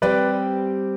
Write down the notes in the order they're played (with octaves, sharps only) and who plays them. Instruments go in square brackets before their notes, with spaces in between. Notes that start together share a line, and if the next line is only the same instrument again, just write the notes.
[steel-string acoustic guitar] G3 C4 G4 [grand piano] B4 D5